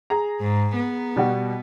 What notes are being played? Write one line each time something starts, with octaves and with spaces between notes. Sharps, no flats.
G#4 A#5
G#2
B3
B2 G3 F#4